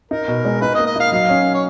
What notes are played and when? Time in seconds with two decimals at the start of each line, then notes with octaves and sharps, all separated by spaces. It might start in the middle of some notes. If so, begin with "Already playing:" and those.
0.11 D#4 A#4
0.28 B2
0.45 G#3
0.61 D#4 B4
0.75 D#5
0.79 A#3
0.87 D#5
0.96 D#4 F5
1.12 F#3 F5
1.29 C#4
1.55 C#5